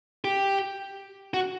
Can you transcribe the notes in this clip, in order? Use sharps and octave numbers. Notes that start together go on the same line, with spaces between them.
G4
F#4